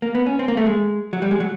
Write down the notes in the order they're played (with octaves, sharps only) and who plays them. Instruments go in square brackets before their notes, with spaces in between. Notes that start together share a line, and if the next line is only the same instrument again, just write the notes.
[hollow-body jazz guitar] A#3
B3
C#4
C4
A#3
A3
G#3
F#3
G3
G#3
F#3